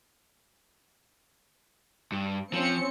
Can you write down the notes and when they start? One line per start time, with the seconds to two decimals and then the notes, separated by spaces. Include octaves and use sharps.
2.12 G2
2.53 F3 C4 C#4 C#7